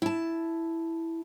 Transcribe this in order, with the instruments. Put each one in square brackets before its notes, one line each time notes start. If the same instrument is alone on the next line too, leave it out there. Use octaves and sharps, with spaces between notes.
[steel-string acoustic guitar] E4 A5